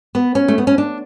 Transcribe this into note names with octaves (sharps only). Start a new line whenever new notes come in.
B3
C#4
A3
B3
C#4
D4